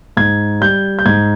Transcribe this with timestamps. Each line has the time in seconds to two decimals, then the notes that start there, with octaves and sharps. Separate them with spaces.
0.17 G#2 G#6
0.61 G3 G6
0.99 G6
1.06 G#2 G#6